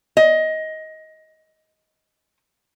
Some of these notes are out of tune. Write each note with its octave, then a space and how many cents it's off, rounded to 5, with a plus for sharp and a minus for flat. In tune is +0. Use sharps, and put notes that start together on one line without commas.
D#5 +15